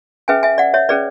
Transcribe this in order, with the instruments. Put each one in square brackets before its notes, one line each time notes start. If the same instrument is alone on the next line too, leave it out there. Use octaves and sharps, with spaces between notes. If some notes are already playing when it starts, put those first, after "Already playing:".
[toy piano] C#4 G#4 B4 E5 G#5
E5 G#5
D5 F#5
C#5 E5
C#4 G#4 B4 D5